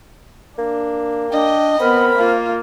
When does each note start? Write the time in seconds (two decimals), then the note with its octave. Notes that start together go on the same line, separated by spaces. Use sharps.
0.58 A#3 D4
1.32 D4 D#5 G5
1.80 B3 C4 A#4 B5
2.18 A#3 F4